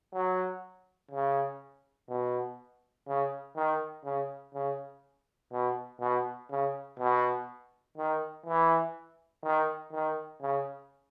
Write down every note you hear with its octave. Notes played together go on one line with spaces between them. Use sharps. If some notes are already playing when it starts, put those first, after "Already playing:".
F#3
C#3
B2
C#3
D#3
C#3
C#3
B2
B2
C#3
B2
D#3
E3
D#3
D#3
C#3